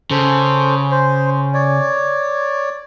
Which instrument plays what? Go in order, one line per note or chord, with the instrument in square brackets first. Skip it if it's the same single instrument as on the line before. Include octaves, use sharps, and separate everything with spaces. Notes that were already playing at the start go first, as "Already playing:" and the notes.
[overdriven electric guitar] C#3 [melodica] A4 C5
[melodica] C5
C#5 D5